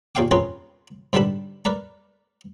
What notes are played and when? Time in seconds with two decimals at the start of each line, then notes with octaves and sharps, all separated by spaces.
0.15 D#2 A#2 G#4 F5 G5 D6
0.31 C4 C#4 F4 G#4 A#4 B4
1.13 G#2 D3 G3 B4 A5 B5
1.65 A#4 B4 D5 A#5